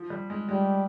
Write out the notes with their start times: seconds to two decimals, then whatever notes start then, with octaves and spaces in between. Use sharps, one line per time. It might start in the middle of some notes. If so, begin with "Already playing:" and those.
Already playing: F3
0.10 G3
0.30 G#3
0.49 G3 G#3